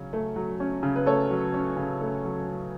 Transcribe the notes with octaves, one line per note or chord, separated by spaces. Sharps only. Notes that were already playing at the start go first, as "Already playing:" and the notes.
Already playing: C#3 F#3 C#4
A3
F#3
C#4
C#3
B4
A3 A4 C#5
F#3
C#4
C#3
A3
F#3
C#4